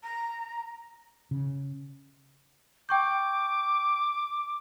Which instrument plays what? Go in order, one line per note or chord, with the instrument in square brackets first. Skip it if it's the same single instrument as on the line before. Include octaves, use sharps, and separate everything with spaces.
[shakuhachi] A#5
[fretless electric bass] C#3
[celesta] G5 C#6 G6 [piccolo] D6